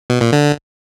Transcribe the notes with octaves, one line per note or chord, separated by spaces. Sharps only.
B2
A#2
D3